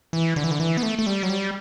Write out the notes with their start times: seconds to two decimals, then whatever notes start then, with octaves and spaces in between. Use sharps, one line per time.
0.13 E3
0.36 D3
0.44 E3
0.51 D3
0.60 E3
0.77 B3
0.83 A3
0.99 A3
1.06 G3
1.23 F#3
1.30 G3